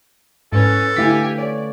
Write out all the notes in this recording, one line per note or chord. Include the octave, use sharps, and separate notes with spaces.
G#2 C#4 E4 A4 B4 C#5
D3 A3 E4 G4 F5 G#5 B6
C#5 D5